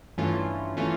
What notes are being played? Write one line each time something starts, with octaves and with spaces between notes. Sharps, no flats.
G2 E3 A3 C#4 F4
E3 A3 C#4 F4